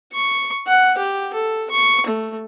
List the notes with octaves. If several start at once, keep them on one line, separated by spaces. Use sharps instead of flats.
C#6
F#5
G4
A4
C#6
A3